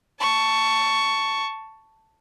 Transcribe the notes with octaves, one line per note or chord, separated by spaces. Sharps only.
A5 C#6